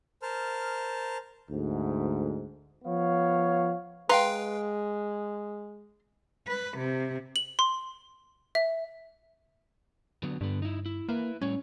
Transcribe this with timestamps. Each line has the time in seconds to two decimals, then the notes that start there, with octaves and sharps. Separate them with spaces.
0.22 A#4 C5 A5 F6
1.50 D2 G#2
2.85 F3 B3 C#5 F5
4.09 G#3 B4 F5 G5 A#5 C6
6.48 B4
6.78 C3
7.36 F#7
7.59 C6
8.55 E5
10.23 D3 F#3 B3
10.41 G2 D3 B3
10.62 D#4 E4
10.86 E4
11.09 A#3 E4 B4 E5
11.42 A2 G3 C#4 C#5